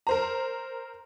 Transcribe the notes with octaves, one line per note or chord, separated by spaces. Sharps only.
A#4 C5 A#5